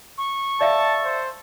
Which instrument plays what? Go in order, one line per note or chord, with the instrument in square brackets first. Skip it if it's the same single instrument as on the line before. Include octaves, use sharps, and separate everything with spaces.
[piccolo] C#6
[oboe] A4 [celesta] D5 E5 F5 [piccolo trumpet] A5
[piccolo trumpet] C5